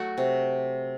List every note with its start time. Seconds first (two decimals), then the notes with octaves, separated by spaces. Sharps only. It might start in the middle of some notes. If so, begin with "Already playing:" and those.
Already playing: F#3 A3 F#4
0.18 C3